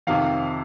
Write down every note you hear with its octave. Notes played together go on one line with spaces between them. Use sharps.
F2 C3 D#3 F5